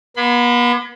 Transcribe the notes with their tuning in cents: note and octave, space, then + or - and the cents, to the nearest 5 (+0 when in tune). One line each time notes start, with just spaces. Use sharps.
B3 -45 B5 +35